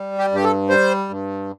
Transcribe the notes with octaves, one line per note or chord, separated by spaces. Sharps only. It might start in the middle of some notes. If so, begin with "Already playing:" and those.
Already playing: G3
G4
G2 G4
A4
G3 C5
G2